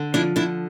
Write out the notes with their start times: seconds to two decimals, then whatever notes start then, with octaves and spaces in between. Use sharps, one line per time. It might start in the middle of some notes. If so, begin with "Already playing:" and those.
Already playing: D3
0.14 F3 D4 E4
0.36 D3 D4 E4